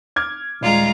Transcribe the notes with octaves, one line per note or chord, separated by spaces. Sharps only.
D6 F6 G#6
D#1 G#3 F4 D5 A#5